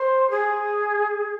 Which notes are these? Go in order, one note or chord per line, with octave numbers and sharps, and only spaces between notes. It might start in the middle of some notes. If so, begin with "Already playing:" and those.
Already playing: C5
G#4